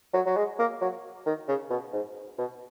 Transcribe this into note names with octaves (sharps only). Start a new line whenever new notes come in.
F#3
F#3
G#3
A#3
F#3
D#3
C#3
B2
G#2
B2